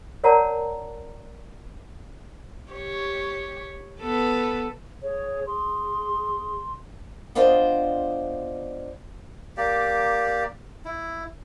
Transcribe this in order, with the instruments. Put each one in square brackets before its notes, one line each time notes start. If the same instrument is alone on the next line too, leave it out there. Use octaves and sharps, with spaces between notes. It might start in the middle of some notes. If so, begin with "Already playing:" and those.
[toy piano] A#4 C#5 D5 F#5 A5 A#5
[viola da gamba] G4 C#5
B3 A4 B4
[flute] G#4 [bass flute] C#5
[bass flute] G#4 [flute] C6
[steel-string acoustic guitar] B3 D4 F4 C5 D5 D#5
[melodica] A#3 G4 D5
E4